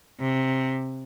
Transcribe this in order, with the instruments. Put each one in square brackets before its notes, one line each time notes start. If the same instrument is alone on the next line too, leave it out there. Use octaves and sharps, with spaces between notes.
[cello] C3